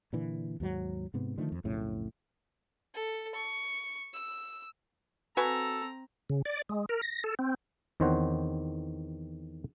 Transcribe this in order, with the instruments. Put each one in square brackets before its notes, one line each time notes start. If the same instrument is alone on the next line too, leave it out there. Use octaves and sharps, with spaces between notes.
[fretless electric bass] A#2 D3 E3
D#2 G#2 F#3
G#2 C3 B3
D3 D#3 F3 A3
F2
B1 F2 A2 C#3
[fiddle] A4
C#6
E6
[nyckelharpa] C4 A#5 [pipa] F#4 B4 G#5 [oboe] A4
[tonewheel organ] C#3
D5
G#3
A#4
A#6
A4
C4
[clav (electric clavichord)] E2 D#3 C4 C5 C#5 F#5